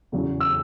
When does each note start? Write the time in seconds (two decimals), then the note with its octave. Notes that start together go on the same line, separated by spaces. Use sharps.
0.12 E2 C#3 F#3
0.40 E6